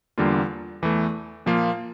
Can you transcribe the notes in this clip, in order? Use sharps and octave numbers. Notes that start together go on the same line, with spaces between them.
E2 D3 G3 A#3 F4
E2 E3 A3
A#2 F3 A#3 F4